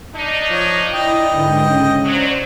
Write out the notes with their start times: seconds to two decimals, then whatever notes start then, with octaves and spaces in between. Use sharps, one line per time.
0.15 D4 D#4
0.49 F3 C#5
0.93 E4 D5 D#5 G5
1.31 G#2 D3 B4
1.70 C#3 C#4
2.05 F#3 C5 D5